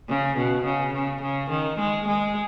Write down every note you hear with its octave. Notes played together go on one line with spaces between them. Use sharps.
C#3
B2
C#3
C#3
C#3
D#3
G#3
G#3